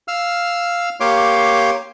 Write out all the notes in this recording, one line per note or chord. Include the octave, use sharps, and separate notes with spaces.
F5 E6 F6
A#3 G4 C#5 F5 C6 D6